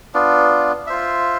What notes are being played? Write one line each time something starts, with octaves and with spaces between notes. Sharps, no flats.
B3 D4 F4
F4 C5 E5